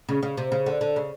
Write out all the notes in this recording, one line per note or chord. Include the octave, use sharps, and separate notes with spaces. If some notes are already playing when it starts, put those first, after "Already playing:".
C#3
C#3
C3
C#3
D3
D3
C#3